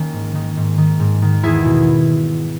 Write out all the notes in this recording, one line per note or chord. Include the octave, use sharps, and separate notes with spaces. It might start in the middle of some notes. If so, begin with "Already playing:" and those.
Already playing: D#3 A#3 C#4
G#2
D#3
G#2
D#3
G#2
D#3
E2 E4 G#4
B2